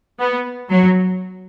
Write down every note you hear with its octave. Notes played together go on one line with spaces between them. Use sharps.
B3
F#3